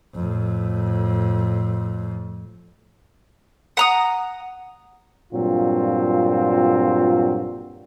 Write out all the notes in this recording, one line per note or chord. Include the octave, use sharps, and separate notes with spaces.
F2 A2
F#5 A#5 D#6
G2 A#2 F#3 C4 F4